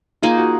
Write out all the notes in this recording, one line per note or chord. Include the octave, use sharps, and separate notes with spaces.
A#3 D#4 F4 G#4
F#4